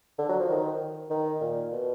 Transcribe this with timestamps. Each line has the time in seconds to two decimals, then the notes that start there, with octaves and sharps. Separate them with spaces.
0.18 D3
0.29 F#3
0.39 F3
0.49 D#3
1.10 D#3
1.41 A#2
1.72 B2